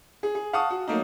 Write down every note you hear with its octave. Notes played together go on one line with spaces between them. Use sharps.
G#4
G#4
F5 F#5 A5 C#6 D#6
F#4
F#3 A3 A#3 D#4